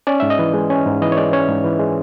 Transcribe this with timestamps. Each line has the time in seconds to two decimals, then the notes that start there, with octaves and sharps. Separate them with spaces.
0.07 C#4 D5
0.20 G#2 E5
0.30 D#5
0.39 E3
0.54 G#3
0.70 C#4
0.86 G#2
1.02 E3 D#5
1.12 C#5
1.17 G#3 D5
1.33 C#4 C#5
1.48 G#2
1.65 E3
1.80 G#3